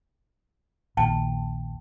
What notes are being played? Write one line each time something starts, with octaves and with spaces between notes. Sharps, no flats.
A#1 D#2 G5 A5